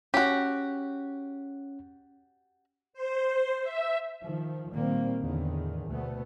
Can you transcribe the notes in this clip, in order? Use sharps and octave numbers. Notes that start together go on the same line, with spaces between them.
C#4 F#4 G4
C5
E5
D#3 F3
A#2 D#3 G3 A#3 C4
E2 A2 D3 D#3
D2 B2 A3 B3